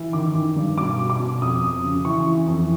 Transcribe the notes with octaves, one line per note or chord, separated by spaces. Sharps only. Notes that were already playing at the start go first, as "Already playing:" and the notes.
Already playing: E3
D#3 D6
D#3
G2
B2 D6
B2
D6
B2
F2 D#6
F2
C#3
E3 C#6
E3
F2